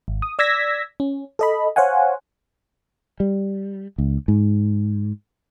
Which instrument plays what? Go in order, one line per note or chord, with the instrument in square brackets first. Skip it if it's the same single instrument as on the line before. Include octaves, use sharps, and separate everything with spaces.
[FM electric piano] G#1
D#6
D5 E6 G#6 A#6 B6
C#4
A4 D#5 B5
C5 C#5 F5 F#5 G#5
[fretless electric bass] G3
C#2
G#2